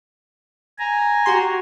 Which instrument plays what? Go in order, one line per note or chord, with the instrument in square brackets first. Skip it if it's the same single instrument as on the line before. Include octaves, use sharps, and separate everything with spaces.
[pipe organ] G#5 A#5
[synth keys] F#4 G4 C6